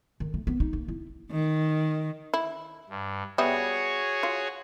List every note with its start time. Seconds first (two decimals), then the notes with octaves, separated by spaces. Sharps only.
0.20 D#3
0.34 A3
0.47 B3
0.60 D#4
0.73 A#3
0.88 E4
1.31 D#3
2.34 E4
2.89 G2
3.38 G3 B3 F#4 G#4 C#5 E5
4.23 F4